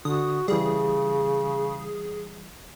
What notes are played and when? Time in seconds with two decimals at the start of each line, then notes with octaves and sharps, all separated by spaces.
0.05 D3 F#4 D#6
0.48 C#3 E3 G3 G#4